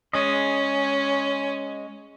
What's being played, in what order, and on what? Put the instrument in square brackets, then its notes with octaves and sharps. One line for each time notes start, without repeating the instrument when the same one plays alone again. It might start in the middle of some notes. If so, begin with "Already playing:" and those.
[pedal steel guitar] G#3 D#5 [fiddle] C#4